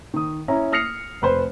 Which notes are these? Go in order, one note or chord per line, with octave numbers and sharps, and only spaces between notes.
D#3 D#6
C#4 E4 A#5
D#6 F6 A#6 C7 C#7 F7
F1 B4 C5